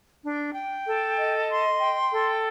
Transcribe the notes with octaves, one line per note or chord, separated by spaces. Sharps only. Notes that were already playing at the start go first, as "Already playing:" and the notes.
D4
G5
A4
D#5
C6
G5
A4